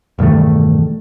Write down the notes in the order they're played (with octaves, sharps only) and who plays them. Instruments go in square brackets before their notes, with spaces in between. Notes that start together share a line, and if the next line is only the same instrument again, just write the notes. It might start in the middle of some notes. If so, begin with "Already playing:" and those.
[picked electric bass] E1 G2 D#3 A3